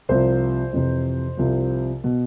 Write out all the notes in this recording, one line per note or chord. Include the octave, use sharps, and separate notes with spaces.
C2 C3 F3 C5
F2 C3 E3
C2 C3 F3
B2